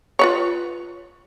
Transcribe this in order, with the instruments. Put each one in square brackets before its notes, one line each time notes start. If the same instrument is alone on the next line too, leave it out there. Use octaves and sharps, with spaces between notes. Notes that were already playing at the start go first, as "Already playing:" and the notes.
[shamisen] F4 B4 C#5